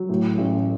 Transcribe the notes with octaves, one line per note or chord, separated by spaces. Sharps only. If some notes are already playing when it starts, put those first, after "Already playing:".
Already playing: F#3
A2
A1